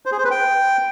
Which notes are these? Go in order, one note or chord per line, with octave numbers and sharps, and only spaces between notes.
C5
G#4
C5
B4
G5